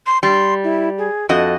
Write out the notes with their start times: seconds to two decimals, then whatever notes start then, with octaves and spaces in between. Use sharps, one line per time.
0.06 C6
0.23 G3 C6
0.64 E4
0.98 G#4
1.29 F2 F#4 A4 D#5